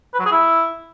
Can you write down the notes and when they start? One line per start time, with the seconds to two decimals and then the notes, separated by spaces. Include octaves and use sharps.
0.13 B4
0.19 F#3
0.25 G#4
0.31 E4